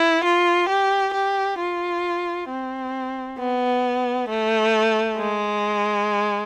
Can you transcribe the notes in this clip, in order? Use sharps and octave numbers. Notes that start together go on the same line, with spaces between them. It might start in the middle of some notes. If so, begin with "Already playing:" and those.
Already playing: E4
F4
G4
G4
F4
C4
B3
A3
G#3